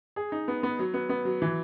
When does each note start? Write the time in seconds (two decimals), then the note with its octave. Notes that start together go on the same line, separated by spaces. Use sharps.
0.16 G#4
0.32 D#4
0.48 B3
0.63 B3
0.79 F#3
0.94 B3
1.09 B3
1.25 F#3
1.42 E3